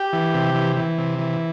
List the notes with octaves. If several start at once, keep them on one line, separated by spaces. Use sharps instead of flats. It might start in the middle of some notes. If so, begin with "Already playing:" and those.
Already playing: G4
E3
C3
E3
E3
C3
E3